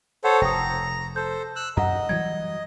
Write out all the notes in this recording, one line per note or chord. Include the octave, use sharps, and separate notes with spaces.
A4 C5 C#5 F#5
F1 G5 A#5 D#6
A4 C5 G6
E6 F#6
F#2 D#5 F#5 A#5
E3 F#3 G3 G#6